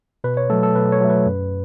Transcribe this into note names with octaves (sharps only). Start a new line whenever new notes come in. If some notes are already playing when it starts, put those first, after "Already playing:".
B2 B4
C#5
F#3 A3 A4
A4
B2 B4
C#5
F#3 A3
B4
F#2